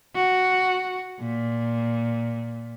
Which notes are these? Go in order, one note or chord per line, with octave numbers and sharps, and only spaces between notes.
F#4
A#2